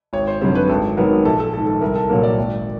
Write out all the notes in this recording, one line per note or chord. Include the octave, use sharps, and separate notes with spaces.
G#1 C#5
C5
F#2 D3 G3 C4 C5
B4
G#1 A4
G#2 D#3 F#3 B3 A#4
A#1 A4
A4
G#2 D#3 A4
A4
C2 A#4
A4
A#2 F#3 A#3 A#4
D5
G#1